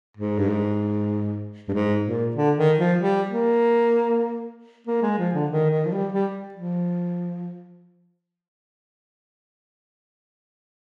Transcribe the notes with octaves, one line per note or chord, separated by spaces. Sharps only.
G#2
G2
G#2
G2
G#2
A#2
D3
D#3
F3
G3
A#3
A#3
G#3
F3
D3
D#3
D#3
F3
G3
G3
F3